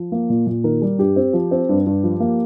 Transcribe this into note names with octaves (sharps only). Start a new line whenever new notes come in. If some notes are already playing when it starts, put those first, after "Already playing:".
Already playing: F3
A#3
A#2
A#2
D#3 A#4
G3
G2 G4
C4
F3
C4
G2
G2
F3
A#3